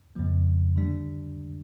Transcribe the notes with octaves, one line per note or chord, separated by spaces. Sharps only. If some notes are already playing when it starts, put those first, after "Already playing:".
F2 C#3 F3 A#3
D3 G3 D4